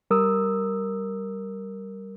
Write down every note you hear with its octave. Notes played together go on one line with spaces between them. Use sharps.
G3 A#4 D#6 E6